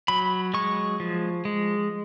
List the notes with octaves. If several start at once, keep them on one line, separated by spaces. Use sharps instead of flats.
F#3 B5
G#3 C#6
F3
G#3